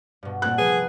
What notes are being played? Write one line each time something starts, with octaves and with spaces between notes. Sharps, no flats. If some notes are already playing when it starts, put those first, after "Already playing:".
G2 B2
A#2 C4 F#4 A4 F#6
C3 F3 B3 G#4 B4